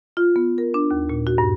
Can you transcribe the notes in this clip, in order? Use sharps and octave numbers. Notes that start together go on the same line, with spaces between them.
F4
B3
A#4
D4
D#2
A#2
F#4
G2